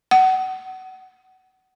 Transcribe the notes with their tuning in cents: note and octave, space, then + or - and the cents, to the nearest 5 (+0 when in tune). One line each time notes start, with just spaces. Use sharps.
F#5 +25